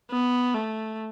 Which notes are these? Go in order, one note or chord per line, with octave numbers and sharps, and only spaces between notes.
B3
A3